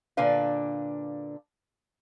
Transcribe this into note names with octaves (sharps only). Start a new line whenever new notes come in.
A#2 D3 D4 B4 F5